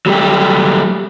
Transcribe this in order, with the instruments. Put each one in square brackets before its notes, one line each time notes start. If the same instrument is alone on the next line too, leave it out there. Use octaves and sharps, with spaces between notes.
[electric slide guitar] F#3 G3 A3 G4